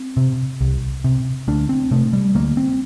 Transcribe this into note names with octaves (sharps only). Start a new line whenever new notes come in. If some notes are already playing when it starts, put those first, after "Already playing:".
Already playing: C4
C3
C2
C3
D2 D4
C4
C3 A3
G3
D2 A#3
C4